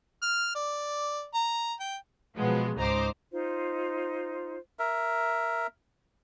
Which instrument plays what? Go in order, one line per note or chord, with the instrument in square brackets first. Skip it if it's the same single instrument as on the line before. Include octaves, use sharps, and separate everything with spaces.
[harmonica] F6
D5
A#5
G5
[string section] B2 F3 F#3 G#3 B3
C#2 G#2 D#4 C5 A#5 D6
[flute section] D#4 F4 C5
[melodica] A#4 E5